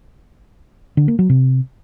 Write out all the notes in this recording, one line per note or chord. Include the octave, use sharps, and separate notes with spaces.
D3
A#3
F#3
C3